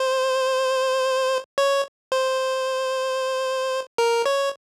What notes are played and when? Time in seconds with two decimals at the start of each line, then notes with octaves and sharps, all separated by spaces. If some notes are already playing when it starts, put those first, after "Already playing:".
Already playing: C5
1.58 C#5
2.12 C5
3.98 A#4
4.26 C#5